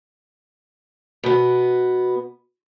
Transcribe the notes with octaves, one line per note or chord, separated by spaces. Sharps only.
B2 B3